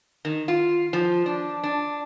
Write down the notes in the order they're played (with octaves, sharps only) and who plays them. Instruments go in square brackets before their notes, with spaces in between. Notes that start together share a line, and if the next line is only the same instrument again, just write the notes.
[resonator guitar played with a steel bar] D#3
F4
F3
D4
D4